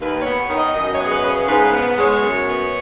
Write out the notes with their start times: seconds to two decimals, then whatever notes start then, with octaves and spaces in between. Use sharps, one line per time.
0.01 D#2 B4
0.20 C#5
0.25 B3
0.50 D#3
0.56 D#5
0.74 F#2 D#5
0.93 C#5
1.00 B3
1.05 G#4
1.12 B4
1.23 C#3
1.29 C#5
1.48 G#2 B4
1.72 B3
1.97 G#3 C#5
2.21 F#2
2.47 B3